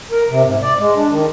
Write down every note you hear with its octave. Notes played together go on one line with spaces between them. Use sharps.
A#4
C3
G#2
D5
G#3
D4
D#3